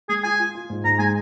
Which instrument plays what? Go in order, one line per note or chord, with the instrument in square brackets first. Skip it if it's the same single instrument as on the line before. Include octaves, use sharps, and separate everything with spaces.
[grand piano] G#3 [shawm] G#4
[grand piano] F4 [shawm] G#5
[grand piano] F4
F4
G#2
[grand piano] G#2 [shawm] A#5
[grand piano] G#3 [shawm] G#5